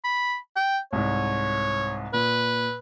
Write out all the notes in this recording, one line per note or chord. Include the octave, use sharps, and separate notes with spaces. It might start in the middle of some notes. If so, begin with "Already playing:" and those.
B5
G5
C2 G#2 C#5
A#2 B4